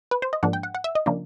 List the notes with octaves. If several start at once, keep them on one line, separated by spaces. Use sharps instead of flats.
B4
C5
D#5
G#2 F3 A#3 D4 F#5
G5
F#5
F#5
E5
D#5
C#3 F3 A#3 D4